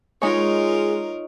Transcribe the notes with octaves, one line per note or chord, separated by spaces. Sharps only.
G#3 D#4 F4 A#4 C#5